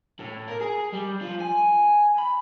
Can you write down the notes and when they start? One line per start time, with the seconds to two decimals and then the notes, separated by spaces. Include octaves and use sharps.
0.20 A2
0.48 A#4
0.61 G#4
0.93 G3
1.21 F3
1.40 G#5
2.18 B5